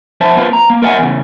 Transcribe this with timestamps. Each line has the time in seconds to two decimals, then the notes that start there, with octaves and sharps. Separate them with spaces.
0.21 F2 C5 E5 A5
0.36 A#3 C4 F4 B4
0.53 A#5
0.70 A#3
0.83 A#4 D#5 E5 F#5 G#5
0.99 E2 C#3